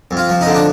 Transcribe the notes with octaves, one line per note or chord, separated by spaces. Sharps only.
F2
F4
F3
D#4
D3
D4